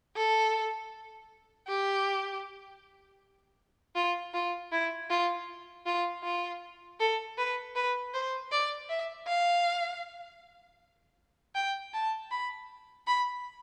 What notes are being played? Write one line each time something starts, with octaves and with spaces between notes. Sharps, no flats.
A4
G4
F4
F4
E4
F4
F4
F4
A4
B4
B4
C5
D5
E5
F5
G5
A5
B5
B5